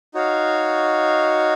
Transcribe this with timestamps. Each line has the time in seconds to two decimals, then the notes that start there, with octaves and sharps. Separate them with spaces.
0.14 D#4 F#4 C#5 F5